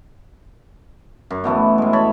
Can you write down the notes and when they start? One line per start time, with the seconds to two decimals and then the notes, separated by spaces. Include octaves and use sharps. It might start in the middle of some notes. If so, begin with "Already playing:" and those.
1.31 F#2
1.44 B2 E3 A3 B3
1.78 A2 G#3
1.93 A4 C#5 B5